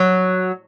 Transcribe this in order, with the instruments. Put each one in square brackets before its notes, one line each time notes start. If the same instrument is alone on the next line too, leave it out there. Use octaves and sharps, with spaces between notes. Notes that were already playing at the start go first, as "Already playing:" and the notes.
Already playing: [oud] F#3